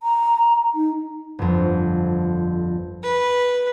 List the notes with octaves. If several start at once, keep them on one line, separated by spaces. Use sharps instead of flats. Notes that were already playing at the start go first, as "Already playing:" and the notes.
A#5
D#4
G1 F2
B4